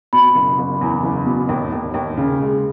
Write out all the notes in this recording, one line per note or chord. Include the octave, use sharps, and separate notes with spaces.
B2 B5
F#1
F#1
E2
F#1
B2
D#2
D#2
D#2
C#3
G#3